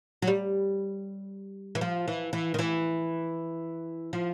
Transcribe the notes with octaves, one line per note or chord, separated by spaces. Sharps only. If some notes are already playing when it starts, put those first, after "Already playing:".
F#3
G3
E3
F3
E3
E3
D#3
E3
F3